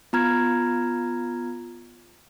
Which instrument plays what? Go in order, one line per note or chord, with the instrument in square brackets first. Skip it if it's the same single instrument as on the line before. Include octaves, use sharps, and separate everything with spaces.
[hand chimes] B3 F4 A#5 F6 G#6